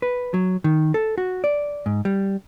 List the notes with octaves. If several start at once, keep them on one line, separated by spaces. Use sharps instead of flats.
B4
F#3
D#3
A4
F#4
D5
G#2
G3